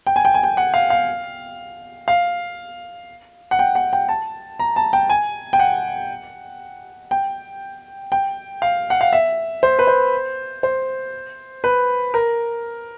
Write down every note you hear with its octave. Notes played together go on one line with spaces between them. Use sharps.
G5
G#5
G5
G#5
G5
F#5
F5
F5
F5
F#5
G5
F#5
G5
A5
A#5
A5
G5
G#5
G5
F#5
G5
G5
F5
F#5
F5
E5
C5
B4
C5
C5
B4
A#4